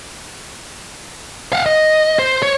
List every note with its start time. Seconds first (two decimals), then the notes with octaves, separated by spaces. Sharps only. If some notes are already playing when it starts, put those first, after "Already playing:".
1.53 F5 F#5
1.66 D#5
2.19 C5
2.43 C#5